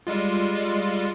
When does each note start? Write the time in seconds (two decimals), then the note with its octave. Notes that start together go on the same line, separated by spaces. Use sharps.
0.07 G3 G#3 F4